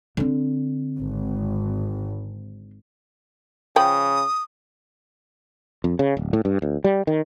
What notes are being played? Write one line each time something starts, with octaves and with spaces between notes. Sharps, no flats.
D3 C4
G#1
C#3 F3 G5 B5 D#6
F2
C#3
D1
A2
G2
D2
G3
D#3